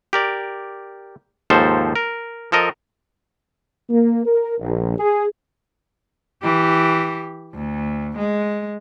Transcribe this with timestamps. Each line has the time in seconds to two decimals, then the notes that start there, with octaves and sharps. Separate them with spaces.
0.13 G4 A#4 D5
1.50 D#2 G#2 F3 A4 C5
1.96 A#4
2.52 F3 A4 A#4 D#5
3.90 A#3
4.26 A#4
4.60 A#1
4.97 G#4
6.42 E3 G4
7.54 D2
8.18 G#3